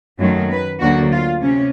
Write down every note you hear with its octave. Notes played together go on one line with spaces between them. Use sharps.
F#2 D#3 F#3 A3
B4
D2 D3 F#3 A#3 F#4
F4
C3 C#4